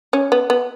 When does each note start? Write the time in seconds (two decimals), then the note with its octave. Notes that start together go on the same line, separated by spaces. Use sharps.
0.13 C#4
0.32 B3
0.50 B3